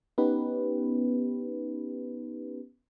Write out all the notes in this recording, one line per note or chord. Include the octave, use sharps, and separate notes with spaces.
B3 C#4 D#4 G4 B4